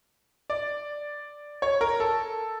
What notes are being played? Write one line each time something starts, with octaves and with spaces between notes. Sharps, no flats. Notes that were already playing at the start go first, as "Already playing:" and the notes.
D5
C#5
A#4
A4